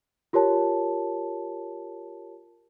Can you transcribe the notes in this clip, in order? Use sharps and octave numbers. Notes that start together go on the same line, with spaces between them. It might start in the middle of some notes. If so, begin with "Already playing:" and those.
F4 G4 A#4 C#5 A5